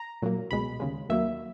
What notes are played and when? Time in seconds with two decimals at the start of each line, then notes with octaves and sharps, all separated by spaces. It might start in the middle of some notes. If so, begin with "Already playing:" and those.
Already playing: A#5
0.22 A#2 F#3 A#3
0.51 C#2 B2 G#3 B5
0.80 D#2 C#3 G#3
1.09 D#2 D#3 F#3 A#3 E5